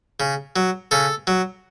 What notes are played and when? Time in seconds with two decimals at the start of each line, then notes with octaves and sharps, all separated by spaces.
0.20 C#3
0.56 F#3
0.91 C#3 A4
1.27 F#3